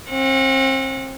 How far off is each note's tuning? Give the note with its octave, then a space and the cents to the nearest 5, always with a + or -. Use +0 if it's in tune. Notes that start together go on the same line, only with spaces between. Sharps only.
C4 +35 F#5 -30